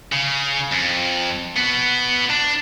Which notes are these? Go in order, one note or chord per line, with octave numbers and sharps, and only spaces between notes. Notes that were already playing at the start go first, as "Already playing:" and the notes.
C#3
F2
B3 F#4
D4